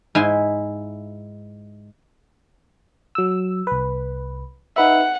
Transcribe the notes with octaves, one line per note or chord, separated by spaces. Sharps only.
G#2 E4 G#5 C6
F#3 E6
C2 B4
D#4 B4 E5 F#5